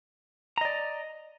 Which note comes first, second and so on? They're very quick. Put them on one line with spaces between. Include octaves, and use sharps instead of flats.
A#5 D#5 D5